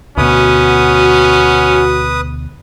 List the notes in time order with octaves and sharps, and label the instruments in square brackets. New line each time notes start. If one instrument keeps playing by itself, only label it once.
[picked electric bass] D2 B2 [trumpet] C#4 [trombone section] F#4 [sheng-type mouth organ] B4 D#6